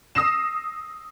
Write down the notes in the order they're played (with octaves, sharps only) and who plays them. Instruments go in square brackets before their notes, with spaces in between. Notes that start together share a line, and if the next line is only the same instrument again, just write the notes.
[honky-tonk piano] D#6 E6 A#6 C7 E7